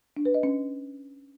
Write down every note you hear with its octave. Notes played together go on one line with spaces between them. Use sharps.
D4
B4
D#5
C#4